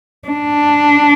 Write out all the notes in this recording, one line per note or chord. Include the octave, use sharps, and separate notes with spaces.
D4